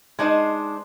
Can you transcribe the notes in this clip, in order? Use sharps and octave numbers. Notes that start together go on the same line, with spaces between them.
G#3 D4 D#4 C5